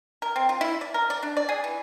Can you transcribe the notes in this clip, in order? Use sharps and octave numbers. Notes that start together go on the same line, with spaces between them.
A#4
C4
F4
E4
D5
A#4
D5
D4
D5
G#4
E3